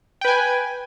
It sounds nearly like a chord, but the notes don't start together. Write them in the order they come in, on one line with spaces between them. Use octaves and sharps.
G5 B4 G#5